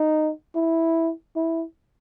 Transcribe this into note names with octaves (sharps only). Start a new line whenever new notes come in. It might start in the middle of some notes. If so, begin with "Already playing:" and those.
Already playing: D#4
E4
E4